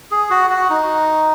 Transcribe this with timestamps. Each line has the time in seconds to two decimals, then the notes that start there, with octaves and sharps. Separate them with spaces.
0.11 G#4
0.30 F#4
0.50 F#4
0.70 D#4